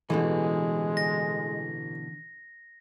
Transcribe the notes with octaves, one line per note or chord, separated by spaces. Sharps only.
A1 B2 D3 E3 G#3
A#6